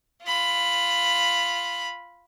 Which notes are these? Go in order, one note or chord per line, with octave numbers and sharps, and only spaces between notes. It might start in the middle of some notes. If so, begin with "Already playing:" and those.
F4 B5